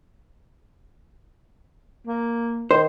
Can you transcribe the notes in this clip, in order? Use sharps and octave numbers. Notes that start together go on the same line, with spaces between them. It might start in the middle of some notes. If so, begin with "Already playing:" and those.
A#3
D#3 C5